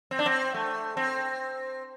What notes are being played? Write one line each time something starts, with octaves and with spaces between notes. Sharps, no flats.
C4
D4
C4
A3
C4